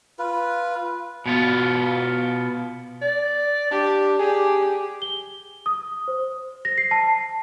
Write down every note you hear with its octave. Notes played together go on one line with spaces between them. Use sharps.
F4 B4
B2 B3 F4
D5
D4 G4
G4 G#4
G7
D#6
C5
A#6
C7
A5